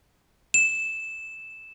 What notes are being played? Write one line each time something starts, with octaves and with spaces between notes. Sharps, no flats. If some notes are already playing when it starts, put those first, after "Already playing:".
E7